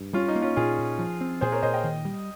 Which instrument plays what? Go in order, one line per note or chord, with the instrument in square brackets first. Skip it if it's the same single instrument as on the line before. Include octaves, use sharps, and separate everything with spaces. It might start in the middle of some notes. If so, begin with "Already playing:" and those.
Already playing: [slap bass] G2
[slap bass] G3 [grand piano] C#4 F4
[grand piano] D#4
[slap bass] A#3
[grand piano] C#4 F4
[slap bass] A#2 [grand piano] F4 G#4
[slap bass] A#2
F3
C4
[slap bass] A#2 [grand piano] G#4 C5
[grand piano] A#4 C#5
[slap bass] A#2 [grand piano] C5 D#5
[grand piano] D#5 G5
[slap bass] D#3
G3